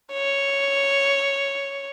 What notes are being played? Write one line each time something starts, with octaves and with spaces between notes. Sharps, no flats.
C#5